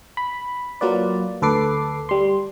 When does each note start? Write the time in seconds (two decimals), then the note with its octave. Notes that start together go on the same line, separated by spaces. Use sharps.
0.17 B5
0.81 F#3 A#3 F4 B4 D5
1.42 D2 A4 B4 D6 C7
2.09 G3 C6